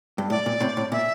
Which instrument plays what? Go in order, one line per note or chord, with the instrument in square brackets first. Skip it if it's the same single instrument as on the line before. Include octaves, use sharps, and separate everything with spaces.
[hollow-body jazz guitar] G2
[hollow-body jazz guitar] A2 [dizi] D5
[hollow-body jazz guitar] A#2
A2 C3
A2
[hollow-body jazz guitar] A#2 [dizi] E5